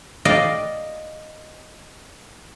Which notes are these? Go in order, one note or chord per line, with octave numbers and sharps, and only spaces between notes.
D5 D#5 F5 G5